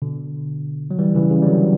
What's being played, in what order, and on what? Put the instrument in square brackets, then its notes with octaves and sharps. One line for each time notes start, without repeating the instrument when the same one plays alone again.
[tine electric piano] B2 D3
F#3
E3 G3
C#3 E3
C#3
G3
D3 F#3